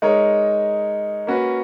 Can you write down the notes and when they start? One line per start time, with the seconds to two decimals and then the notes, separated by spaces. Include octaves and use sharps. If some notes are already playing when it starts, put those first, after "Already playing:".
0.02 G#3 D#4 A#4 C#5
1.27 A#3 C#4 F#4 B4